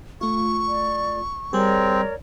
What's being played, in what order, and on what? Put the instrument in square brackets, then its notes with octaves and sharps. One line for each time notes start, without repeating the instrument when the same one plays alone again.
[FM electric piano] A3 F4 [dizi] C#6
[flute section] D5
[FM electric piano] G3 G#4 [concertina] C4 [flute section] A#4 C#5 D5